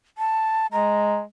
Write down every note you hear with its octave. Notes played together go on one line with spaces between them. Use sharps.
A5
G#3 A#5